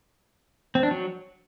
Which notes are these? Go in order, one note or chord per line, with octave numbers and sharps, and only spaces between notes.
C4
D4
F#3